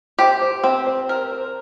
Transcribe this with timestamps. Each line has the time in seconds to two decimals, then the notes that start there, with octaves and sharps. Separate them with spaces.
0.19 G4 C5
0.42 C5
0.63 C4 C5
0.87 C5
1.09 A#4 C5
1.32 C5